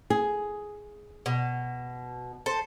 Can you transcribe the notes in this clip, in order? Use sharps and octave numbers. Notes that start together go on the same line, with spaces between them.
G#4
B2
A4 C5